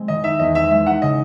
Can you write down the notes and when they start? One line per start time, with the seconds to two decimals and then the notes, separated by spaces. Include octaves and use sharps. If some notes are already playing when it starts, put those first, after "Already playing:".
Already playing: G#3 C4
0.08 D#3 D#5
0.24 D#4 E5
0.39 E2 D#5
0.55 C4 E5
0.71 G#3 E5
0.86 D#4 F#5
1.02 C#3 D#5